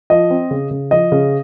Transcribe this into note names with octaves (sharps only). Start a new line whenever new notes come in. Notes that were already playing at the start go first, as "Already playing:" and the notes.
F3 D#5
C4
C#3
C#3
F3 D#5
C#3